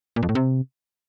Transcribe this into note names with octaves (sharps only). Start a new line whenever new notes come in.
A#2
F2
A2
C3